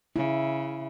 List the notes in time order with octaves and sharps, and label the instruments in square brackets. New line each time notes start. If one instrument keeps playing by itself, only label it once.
[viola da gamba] C#3 [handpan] E4